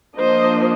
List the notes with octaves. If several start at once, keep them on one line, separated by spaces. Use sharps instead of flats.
F3 A#3 D4 C5 D#5